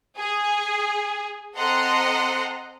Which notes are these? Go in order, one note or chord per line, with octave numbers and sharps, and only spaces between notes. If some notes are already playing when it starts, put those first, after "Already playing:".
G#4
C4 A4 D#5 F#5 A#5 C6